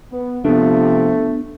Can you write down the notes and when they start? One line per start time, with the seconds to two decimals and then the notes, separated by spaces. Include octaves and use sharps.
0.12 B3
0.45 C3 F3 A3 B3 D4